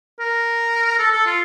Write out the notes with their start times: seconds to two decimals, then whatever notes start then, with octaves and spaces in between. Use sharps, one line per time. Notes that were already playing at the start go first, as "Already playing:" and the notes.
0.19 A#4
0.99 A4
1.12 A4
1.26 F4